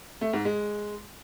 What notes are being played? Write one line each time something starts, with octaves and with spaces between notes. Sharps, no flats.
A3
G#2
G#3